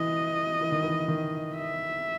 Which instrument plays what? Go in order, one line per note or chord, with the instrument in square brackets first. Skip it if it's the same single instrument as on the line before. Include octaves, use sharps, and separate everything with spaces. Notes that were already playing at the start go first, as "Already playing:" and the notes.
Already playing: [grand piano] E3 [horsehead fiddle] D#5
[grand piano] E3
D#3
E3
D#3
[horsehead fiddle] E5